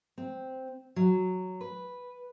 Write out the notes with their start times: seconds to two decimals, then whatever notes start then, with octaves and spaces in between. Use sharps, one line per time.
0.18 C4
0.96 F#3
1.61 B4